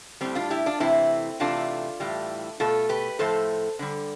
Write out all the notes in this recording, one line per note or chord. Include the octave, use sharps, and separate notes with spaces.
A2 G3 C4
D4 F4
E4 G4
D4 F4
C3 E3 A3 C4 E4
C3 E3 A3 D4 F4
A2 E3 G3
B2 A3 F4 A4
G4 B4
A2 F3 A3 A4 C5
D3 G3